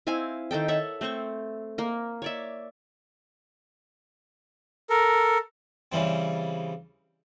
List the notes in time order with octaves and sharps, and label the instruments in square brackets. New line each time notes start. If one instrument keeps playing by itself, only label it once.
[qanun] C4 E4 F5 G#5
D#3 D#4 A4 G5
A4 C#5 E5 F#5
A3 C4 C5 C#6
A#3 A#4
C#5 D5 E5
[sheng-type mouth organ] A4 A#4
[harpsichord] C#3 E3 G3 C4